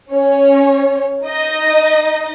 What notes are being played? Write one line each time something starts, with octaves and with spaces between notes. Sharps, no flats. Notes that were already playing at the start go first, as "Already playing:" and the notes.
C#4 C#5
D#4 D#5